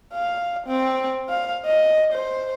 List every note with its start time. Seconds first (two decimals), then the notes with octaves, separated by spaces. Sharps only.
0.14 F5
0.67 C4
1.29 F5
1.65 D#5
2.13 C5